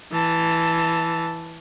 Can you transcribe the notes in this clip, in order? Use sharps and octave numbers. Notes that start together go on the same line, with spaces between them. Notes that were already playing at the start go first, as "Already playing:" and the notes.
E3 A5